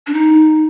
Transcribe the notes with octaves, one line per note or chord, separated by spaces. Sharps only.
D4
D#4